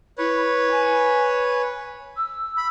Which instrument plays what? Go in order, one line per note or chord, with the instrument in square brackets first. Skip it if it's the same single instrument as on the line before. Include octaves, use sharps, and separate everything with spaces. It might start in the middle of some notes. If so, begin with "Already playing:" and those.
[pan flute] E4 [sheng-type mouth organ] B4 C#5
[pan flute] G#5
E6
[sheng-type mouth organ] B5